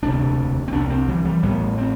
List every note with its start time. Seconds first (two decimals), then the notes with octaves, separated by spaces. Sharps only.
0.02 E1 D2 C3 D4
0.68 C4
0.72 C2 C3 D4
0.90 C4
1.08 E3
1.25 G3
1.42 A1 A2 B3
1.78 C4